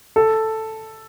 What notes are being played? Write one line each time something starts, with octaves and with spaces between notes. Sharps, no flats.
A4